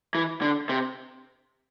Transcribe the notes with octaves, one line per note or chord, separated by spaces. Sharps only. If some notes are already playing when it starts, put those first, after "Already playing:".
E3
D3
C3